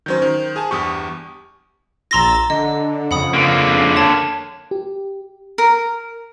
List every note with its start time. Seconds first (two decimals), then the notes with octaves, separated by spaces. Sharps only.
0.06 D#3 F#3 C#4 C5 G6
0.22 D#3
0.56 G#4 G#5 A5
0.71 E2 G2 G4 C#6 D#6
2.11 A#1 A#5 C6 E6 A6 A#6
2.50 D3 D#5
3.11 F2 C#3 F#5 B5 D#6
3.33 D3 A#3
3.96 C#5 A5 G#6
4.71 G4
5.58 A#4